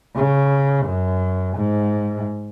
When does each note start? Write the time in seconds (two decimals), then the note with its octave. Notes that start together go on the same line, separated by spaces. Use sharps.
0.16 C#3
0.86 F#2
1.56 G#2